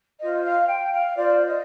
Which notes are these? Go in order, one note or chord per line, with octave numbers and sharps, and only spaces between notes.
F4 C5 D#5
F5
G5
F5
F4 C5 D5
D#5